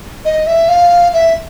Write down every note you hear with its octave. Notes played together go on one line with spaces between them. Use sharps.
D#5
E5
F5
E5